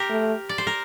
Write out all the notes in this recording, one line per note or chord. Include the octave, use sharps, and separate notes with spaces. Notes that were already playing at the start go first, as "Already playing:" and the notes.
Already playing: G4 A#4 C5
A3
D5
C5
A#4